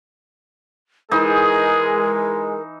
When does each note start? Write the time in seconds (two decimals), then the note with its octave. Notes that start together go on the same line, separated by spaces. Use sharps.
1.11 E3 G#3 D#4 G#4 A#4